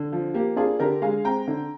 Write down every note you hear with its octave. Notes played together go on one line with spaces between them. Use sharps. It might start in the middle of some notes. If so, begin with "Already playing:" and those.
Already playing: D3
F3
A#3 G4
D4 F4 G#4
D3 G4 A#4
G#3 F5 G#5
C4 G5 A#5
D3